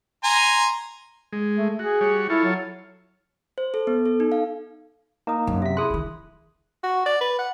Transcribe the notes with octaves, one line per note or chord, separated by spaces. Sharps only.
G#5 A#5 C6
G#3
A3
F#4 G#4
G3 F#4 C#5
E4 F4 A4 C#5
F#3
C5
A4
B3
A4
D#4
F5
A#3 D#4 A#5 D#6
F#2
C3 E5 B6
E4 G#4 C6 D#6 F#6
D#3 F#3
F#4
D5
B4
F#5